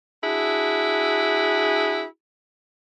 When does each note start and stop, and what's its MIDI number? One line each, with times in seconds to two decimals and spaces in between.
0.23 2.04 62
0.23 2.04 64
0.23 2.04 66
0.23 2.04 68